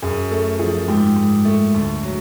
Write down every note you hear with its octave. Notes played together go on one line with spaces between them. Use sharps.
F#2 G#4
A3 A4
F3 G#4
G#2 G4
G#2
A3
D2
F#3